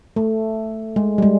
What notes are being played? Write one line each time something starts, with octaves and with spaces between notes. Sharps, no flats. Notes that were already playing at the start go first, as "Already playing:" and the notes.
A3
G#3
G3
G#3